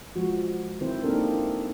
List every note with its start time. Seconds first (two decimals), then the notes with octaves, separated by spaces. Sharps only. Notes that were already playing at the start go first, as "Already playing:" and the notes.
0.16 F3 G#3 F#4
0.81 D#3 C4 E4 C5
1.03 A#3 C4 D4 D#4 A4 A#4
1.29 E4